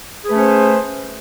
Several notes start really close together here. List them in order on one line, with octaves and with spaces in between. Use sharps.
G#4 B4 A3 C#4 C5